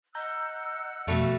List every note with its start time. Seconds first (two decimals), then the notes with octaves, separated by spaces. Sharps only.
0.15 D#5 F#5 A#5 E6 F#6 G6
1.07 F2 B2 G3 A3 F#4 F5